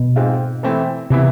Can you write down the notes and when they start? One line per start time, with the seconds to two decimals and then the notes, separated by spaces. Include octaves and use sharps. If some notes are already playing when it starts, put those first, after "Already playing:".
Already playing: B2
0.16 G#2 G#3 C4 F4
0.63 E3 A3 C4 E4
1.10 C3 E3 B3 E4